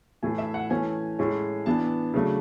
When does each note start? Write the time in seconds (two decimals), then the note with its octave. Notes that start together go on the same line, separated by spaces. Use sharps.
0.23 A2 E3 A3 G#5
0.38 E5
0.54 F#5
0.70 E3 A3 C#4 G#5
1.19 A2 G#3 C#4
1.66 E3 B3 D4 A5
2.14 C#3 F#3 A3 D4